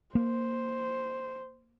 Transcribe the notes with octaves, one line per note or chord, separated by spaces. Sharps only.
A#3 C5